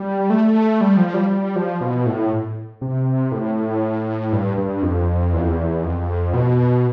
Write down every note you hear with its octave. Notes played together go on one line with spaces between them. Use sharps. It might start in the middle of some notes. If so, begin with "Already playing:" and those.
Already playing: G3
A3
G3
F3
G3
G3
F3
B2
A2
C3
A2
G2
G2
F2
E2
F2
E2
F2
B2